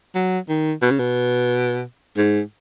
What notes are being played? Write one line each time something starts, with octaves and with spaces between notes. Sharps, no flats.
F#3
D#3
B2
C#3
B2
G#2